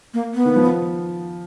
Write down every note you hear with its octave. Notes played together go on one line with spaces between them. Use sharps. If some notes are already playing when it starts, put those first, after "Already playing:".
A#3
B3
D#3
F3